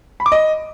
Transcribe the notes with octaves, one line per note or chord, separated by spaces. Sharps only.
B5
D6
D#5